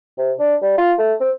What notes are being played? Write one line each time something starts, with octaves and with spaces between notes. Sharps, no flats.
C3
D4
G3
F4
A3
C4